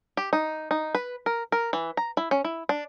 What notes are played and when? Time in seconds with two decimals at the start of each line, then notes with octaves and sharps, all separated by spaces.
0.17 G4
0.33 D#4
0.71 D#4
0.95 B4
1.26 A#4
1.52 A#4
1.73 E3
1.97 A#5
2.17 E4
2.31 C#4
2.44 E4
2.69 D4